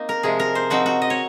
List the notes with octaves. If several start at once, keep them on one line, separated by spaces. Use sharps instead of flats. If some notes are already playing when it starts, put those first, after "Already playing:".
Already playing: A#3 C4 D#4
A#4
C3 F3 G#3 G#4
A#4
C5
F3 C4 D#4 F#4
F#4
D#5
C#5